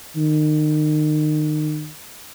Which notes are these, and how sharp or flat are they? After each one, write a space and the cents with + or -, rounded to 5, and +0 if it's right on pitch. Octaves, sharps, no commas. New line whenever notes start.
D#3 -30